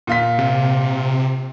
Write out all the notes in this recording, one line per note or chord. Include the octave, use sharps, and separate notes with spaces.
A#2 F4 B6
C3